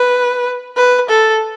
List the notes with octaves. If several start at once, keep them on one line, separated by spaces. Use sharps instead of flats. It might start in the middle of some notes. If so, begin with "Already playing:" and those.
Already playing: B4
B4
A4